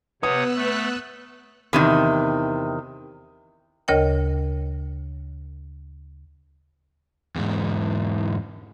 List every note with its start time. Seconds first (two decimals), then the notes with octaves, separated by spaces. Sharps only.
0.22 C3 B3 B4 C#5 F#5 D#6 E6 F#6
0.56 A3
1.73 E2 C3 D#3
3.88 D2 C#3 A#4 C#5 D#5 G5
7.36 E2 G#2